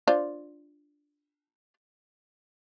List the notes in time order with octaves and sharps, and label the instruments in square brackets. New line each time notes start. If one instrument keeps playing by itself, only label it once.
[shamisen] D4 F4 C5